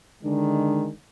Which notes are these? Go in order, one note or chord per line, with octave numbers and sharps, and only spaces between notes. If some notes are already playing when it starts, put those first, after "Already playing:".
D3 D#3 G#3 D4